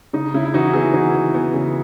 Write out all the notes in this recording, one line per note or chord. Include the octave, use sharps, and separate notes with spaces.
C#3 D#4
C#3 E4
E4
E3 D#4 F#4
B3 E4 G#4
E3 D#4 F#4
E3
B3
C#3